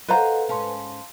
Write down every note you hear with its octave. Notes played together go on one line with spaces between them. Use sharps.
A4 B4 C5 D#5 F5 F#5 A#5
G#2 C#4 F5 A5 C6